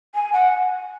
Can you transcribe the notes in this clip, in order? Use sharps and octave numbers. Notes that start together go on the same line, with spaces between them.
G#5
F#5